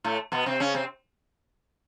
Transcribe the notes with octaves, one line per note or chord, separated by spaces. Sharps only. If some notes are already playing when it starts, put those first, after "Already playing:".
A2 A3
B2 B3
C3 C4
C#3 C#4
C3 C4